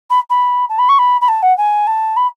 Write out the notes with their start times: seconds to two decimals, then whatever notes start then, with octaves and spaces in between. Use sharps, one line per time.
0.10 B5
0.30 B5
0.69 A5
0.79 B5
0.89 C#6
0.99 B5
1.21 B5
1.28 A5
1.42 F#5
1.57 G#5
1.87 A5
2.16 B5